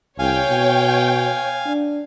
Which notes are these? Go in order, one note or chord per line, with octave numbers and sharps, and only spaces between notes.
C2 C#5 F5 G5 G#5
B2
D4